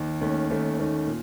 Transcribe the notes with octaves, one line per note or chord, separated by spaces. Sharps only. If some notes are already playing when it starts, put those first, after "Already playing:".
Already playing: D#2 D#3
D#2 D#3 A3 C#4
D#2 D#3 A3 C#4
D#2 D#3 A3 C#4
A#2